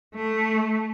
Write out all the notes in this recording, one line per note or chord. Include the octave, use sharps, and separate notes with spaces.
A3